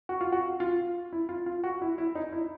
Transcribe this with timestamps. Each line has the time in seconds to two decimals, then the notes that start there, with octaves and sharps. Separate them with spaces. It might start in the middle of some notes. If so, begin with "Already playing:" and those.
0.09 F#4
0.21 F4
0.32 F#4
0.60 F4
1.13 E4
1.29 F4
1.46 F4
1.64 F#4
1.82 E4
1.98 E4
2.15 D#4
2.33 E4